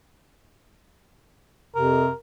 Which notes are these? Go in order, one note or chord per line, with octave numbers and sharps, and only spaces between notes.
F2 C3 A#4